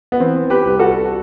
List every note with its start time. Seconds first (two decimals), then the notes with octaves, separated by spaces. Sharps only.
0.12 B3
0.20 E3 C4
0.50 G4 B4
0.65 C2
0.79 F#4 A4